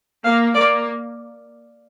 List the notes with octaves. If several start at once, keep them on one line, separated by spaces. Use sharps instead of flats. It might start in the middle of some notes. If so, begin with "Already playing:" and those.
A#3 F5
A#3 D5